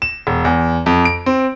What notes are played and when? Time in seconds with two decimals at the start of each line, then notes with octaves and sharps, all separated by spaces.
0.02 E7
0.27 E1
0.45 E2
0.86 F2
1.05 D7
1.26 C4